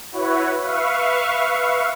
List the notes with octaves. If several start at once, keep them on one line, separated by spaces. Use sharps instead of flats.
E4 F#4 B4 C#5
B4 E5 F5 C#6